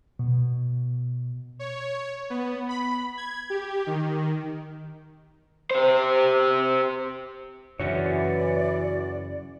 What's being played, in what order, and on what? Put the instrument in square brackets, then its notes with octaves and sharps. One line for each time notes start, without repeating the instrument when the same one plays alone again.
[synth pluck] B2
[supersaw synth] C#5
B3
B5
G#6
G4
D#3
[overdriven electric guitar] G4 C5
[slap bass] F#2 C#3 [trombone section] E3 [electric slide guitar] F#4 C#5 [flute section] D5